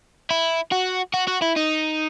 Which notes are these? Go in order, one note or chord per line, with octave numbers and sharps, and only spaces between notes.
E4
F#4
F#4
F#4
E4
D#4